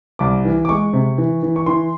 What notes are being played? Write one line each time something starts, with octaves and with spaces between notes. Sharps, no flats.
C2 D6
E3
D6
G#3 C#6
C3
E3
E3
C#6
E3 C6